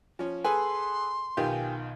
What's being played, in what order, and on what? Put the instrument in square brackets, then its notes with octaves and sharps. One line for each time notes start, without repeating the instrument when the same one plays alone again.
[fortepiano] F3 C#4
[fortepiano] G#4 A4 B4 [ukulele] G#5 [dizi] C6
[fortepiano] B1 D#3 F4 [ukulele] G4 G#5